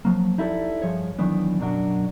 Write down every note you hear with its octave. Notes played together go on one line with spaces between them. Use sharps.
F3 F#3 A#3
D#4 E4 G4 A4 C#5 D5
G2 F3 G#4 C#5
D#3 E3 F#3 B3 D4
F#2 B2 F#3 D4 F#4